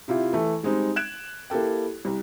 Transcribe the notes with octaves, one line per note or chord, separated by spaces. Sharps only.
C3 E4 F4 G4
E3 A3
G3 G#3 C4 D#4
F#6 G#6 D7 E7
A#3 E4 G4 A4 G5
C2